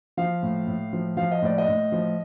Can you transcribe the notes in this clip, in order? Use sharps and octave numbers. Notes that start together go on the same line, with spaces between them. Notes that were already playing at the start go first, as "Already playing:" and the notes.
F3 F5
A2
A2
F3
F3 F5
D#5
A2 D5
D#5
A2
F3